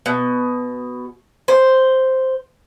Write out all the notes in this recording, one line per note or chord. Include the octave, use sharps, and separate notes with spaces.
B2
C5